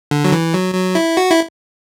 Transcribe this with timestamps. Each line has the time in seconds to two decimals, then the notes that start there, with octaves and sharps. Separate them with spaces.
0.11 D3
0.24 F#3
0.32 E3
0.53 F#3
0.75 F#3
0.95 E4
1.17 F#4
1.31 E4